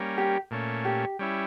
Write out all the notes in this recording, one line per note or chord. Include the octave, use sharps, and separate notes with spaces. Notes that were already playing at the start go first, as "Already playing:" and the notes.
Already playing: G3 A#3 C#4
G4
A#2 A3 C#4
G4
G3 C#4 E4